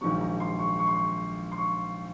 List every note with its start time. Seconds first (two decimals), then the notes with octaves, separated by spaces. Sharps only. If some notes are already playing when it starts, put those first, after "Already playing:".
0.01 A#1 G#2 D#3 F#3 C#6
0.21 A#5
0.40 C6
0.59 C#6
0.79 C#6
0.87 C6
0.95 C#6
1.52 C6
1.57 C#6